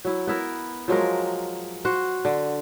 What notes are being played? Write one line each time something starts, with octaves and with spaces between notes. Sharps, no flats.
F#3 E4
B3 E4 A#4
F3 F#3 G#3 A#4
F#4 C5
D3